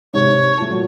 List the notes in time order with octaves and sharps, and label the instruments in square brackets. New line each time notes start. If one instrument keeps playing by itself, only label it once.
[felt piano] G#2 C3 [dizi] C#5
[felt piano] C3
A3 F4 A5
A#2 F#3